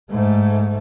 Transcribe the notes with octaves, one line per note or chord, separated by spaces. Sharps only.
G#2 A3